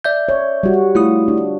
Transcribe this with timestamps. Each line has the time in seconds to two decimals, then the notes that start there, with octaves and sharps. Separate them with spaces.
0.04 D5 E5 G6
0.29 C#5
0.63 G3 F#4
0.95 A3 E4 F4 D#6
1.28 D4